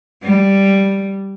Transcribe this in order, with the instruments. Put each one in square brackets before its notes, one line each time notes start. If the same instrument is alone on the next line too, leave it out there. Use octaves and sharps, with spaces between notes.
[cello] G3